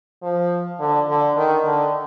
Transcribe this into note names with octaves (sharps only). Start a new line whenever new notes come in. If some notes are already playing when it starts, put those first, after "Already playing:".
F3
D3
D3
D#3
D3